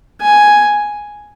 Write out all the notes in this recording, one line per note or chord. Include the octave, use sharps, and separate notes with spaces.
G#5